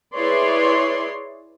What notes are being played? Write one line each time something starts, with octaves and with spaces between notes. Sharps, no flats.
E4 G#4 B4 C#5 D5 C6